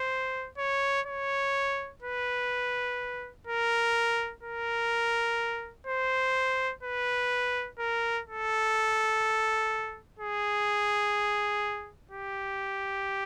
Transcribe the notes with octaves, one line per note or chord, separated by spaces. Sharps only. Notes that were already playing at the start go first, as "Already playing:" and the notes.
Already playing: C5
C#5
C#5
B4
A#4
A#4
C5
B4
A#4
A4
G#4
G4